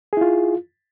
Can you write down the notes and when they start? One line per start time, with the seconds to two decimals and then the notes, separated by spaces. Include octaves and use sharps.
0.13 G#4
0.17 E4
0.21 F4